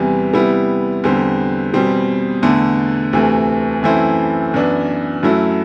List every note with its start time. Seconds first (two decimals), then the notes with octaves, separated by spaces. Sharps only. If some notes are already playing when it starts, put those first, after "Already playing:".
Already playing: E2 C3 E3 G3
0.33 C3 G3 B3 E4
1.04 E2 D3 G3 C4
1.74 E2 B2 G3 C4
2.43 E2 D3 A3
3.13 D2 C3 E3 A3
3.83 F#2 E3 A3 C4 E4
4.54 F#2 E3 B3 D4
5.23 F#2 F#3 A3 E4